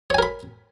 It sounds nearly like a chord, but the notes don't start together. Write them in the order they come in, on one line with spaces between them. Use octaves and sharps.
C#5 G#5 A#4 B5